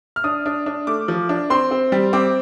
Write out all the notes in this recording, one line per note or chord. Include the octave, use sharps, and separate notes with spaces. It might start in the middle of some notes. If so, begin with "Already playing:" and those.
F6
D4 D#6
D4
D4
A3 D6
F3
D4
C4 C6
C4
G3
C4 D6